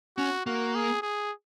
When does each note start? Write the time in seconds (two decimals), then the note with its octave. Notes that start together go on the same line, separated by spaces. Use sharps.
0.17 C#4 F#4
0.46 A#3 F#4
0.75 G#4
1.02 G#4